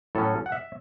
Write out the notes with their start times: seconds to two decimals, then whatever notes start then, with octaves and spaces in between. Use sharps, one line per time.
0.15 A2 F#3 C#4 A4
0.46 F#5
0.52 E5